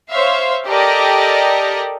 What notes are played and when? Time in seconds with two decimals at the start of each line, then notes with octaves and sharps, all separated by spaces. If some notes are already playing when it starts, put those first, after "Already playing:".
0.10 C5 C#5 E5 F5
0.65 G4 A4 A#4 D5 D#5